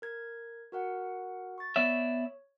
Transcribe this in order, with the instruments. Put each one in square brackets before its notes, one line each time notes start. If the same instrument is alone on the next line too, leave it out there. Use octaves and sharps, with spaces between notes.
[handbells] A#4 G#6
F#4 A#4 F#5
C#6 A6
[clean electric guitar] B3 D5 E5 [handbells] C#5